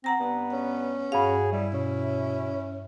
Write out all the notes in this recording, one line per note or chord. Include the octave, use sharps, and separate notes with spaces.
C4 F#5 A#5 A#6
G2 B3
C#4
G2 F#4 G#4 F5
G3 E4
B2 C#4